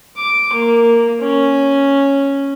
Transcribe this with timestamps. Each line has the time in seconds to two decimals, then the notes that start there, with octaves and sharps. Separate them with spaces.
0.17 D6
0.53 A#3
1.21 C#4